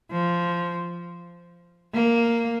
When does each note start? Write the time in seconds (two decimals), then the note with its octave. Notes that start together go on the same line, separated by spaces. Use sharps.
0.11 F3
1.94 A#3